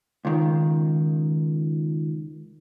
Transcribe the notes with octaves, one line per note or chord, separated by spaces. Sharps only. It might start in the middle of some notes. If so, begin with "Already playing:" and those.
C#2 D#3